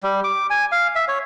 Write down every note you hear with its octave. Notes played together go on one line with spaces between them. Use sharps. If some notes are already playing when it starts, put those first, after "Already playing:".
G3
D6
G#5
F5
E5
C#5